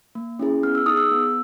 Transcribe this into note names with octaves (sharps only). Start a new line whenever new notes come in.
A#3
C#4 E4 G#4
B3 F6
E6
D#4 G#4 D#6
E6
B3